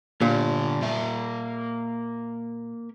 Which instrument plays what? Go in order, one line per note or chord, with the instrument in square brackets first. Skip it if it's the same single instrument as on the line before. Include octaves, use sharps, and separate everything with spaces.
[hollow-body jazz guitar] A#2 [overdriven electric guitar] D3 G4
[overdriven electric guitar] A#3 E5